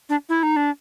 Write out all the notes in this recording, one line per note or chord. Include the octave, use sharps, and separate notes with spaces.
D4
E4
D#4
D4